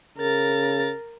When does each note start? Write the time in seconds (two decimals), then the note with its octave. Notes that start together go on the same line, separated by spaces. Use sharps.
0.18 C#3 A#4 A6